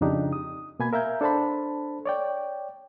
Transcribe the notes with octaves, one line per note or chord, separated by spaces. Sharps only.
F2 C#3 D4 D#4 G4
D#6
B2 A#3 G#5 B5 G#6
A#4 E5 F5 A#5 G6
D4 A4 C5 A5 B5
C#5 D5 G5